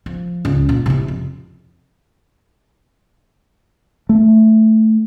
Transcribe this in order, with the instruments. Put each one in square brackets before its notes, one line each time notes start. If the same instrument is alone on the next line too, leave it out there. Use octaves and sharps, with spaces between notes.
[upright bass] F3
C#2
A#2
C3 E4
F2
[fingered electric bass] A3